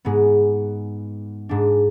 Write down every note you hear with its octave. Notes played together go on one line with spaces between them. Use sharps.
G#2 G#3 B3
G#2 G#3 D4